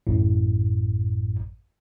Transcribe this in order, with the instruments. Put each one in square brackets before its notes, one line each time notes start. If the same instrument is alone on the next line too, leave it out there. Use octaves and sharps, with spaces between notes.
[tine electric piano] A1 F#2 A2